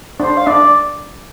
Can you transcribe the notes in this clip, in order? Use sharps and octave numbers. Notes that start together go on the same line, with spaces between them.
D4 C5
F5
D4 D5